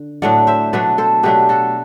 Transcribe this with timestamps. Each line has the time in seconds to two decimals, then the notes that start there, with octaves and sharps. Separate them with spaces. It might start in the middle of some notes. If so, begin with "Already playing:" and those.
Already playing: D3
0.22 A2 F#3 A3 D4 D5 F#5
0.47 C5 E5
0.73 B2 F#3 A3 D4 B4 D5
0.98 A4 C5
1.23 B2 F#3 A3 D4 G4 B4
1.49 F#4 A4